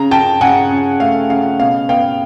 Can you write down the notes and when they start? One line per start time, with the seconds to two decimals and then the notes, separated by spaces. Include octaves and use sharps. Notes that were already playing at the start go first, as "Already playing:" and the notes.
Already playing: C#3 A#5
0.11 C#3 G5 A5
0.41 C#3 F#5 G#5
0.71 C#3
1.00 A3 F5
1.29 C#3 F5
1.59 B2 F5
1.89 B3 F5 G5